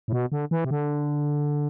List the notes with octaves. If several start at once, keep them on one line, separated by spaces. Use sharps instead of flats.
A2
B2
D3
E3
C3
D3